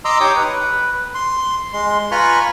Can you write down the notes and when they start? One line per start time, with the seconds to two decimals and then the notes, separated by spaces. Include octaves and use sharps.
0.05 D#5 A#5 C6 D6 E6
0.20 D#4 G4 C#5 D6 D#6
0.36 B4
1.15 C6
1.73 G#3 C6
2.11 F4 B4 G#5 A#5 B5 C#6